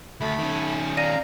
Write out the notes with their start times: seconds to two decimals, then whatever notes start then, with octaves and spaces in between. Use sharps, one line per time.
0.21 D2 A3 B5
0.39 D#3 C#4
0.97 D5 F5 A#5 A#6 D#7